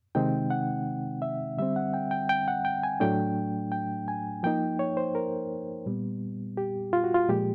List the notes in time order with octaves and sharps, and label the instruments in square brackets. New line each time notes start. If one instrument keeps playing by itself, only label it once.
[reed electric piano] C3 D#3 G#3 C4 D#4 G5
F#5
E5
D3 G3 C4 E5
F#5
G5
G5
G5
F#5
G5
G#5
A2 F#3 A3 D4 G5
G5
G#5
F3 A#3 D#4 G5
C#5
C5
A#4
A#2 G3 B3
G4
F4
F#4
F4
A#2 F3 G#3 G4